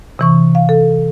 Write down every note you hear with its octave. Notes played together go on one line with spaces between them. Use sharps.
C3 E3 C#6
F5
A4